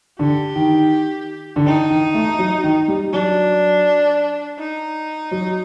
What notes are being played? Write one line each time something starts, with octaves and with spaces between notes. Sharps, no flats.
D3 G4
D#3
D3
D#3 D#4
D#3
A3
F#3
D#3
G3
F#3 D4
D#4
F#3